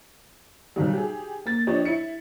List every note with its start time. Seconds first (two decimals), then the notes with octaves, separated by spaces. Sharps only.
0.76 B1 D#3 G3
0.93 G4 G#4
1.46 A#3 A6
1.67 F3 D4 G4 C#5 D#5
1.85 E4 C#7